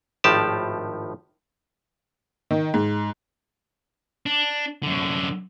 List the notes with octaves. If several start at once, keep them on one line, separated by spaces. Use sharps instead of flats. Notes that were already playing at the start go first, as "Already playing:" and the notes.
G#1 A2 F3 G4 A5
D#3
G#2
D4
F#2 D3